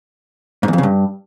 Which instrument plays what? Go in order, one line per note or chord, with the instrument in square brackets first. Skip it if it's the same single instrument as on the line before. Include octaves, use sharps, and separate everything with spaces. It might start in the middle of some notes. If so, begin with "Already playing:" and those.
[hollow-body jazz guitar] G#2
E2
F2
C#3
G2